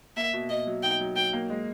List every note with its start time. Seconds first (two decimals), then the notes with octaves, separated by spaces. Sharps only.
0.16 A#3 E5
0.33 B2
0.50 B2 D#5
0.67 F#3
0.83 D#4 G5
1.00 F#3
1.16 F#3 G5
1.33 A#3
1.50 G#3